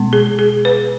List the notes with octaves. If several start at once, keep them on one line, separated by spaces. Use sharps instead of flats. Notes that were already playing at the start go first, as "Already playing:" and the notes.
Already playing: B2 G#3 B3
G#4
G#4
B4